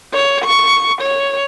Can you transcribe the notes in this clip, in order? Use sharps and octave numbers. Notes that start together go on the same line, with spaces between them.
C#5
C#6
C#5